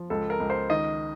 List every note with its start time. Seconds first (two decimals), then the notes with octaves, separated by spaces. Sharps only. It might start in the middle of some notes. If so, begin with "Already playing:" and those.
Already playing: F3
0.10 C#2 A4
0.30 A#4
0.40 C#2
0.50 C5
0.70 D#3 D#5